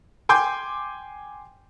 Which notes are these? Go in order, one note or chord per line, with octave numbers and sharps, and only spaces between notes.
G5 G#5 C6 D6 G6